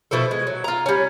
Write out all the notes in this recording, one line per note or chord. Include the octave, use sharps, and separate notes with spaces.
B2 F3 E4 A4
G#3
F#3
F4 A#5
G3 C#4